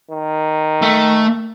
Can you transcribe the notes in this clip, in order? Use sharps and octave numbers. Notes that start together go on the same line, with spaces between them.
D#3
A3